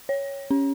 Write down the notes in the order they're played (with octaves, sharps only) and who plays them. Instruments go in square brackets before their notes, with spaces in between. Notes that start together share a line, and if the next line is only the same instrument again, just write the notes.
[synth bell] C#5
C#4